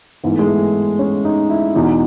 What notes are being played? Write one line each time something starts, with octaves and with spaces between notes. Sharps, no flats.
G#2 E3 B3
A3
G#3
A3
C#4
D#4
E4
E2 B2 D#4